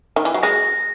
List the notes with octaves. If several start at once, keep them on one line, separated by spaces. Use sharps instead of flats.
D#3
E3
F#3
G#3 A#6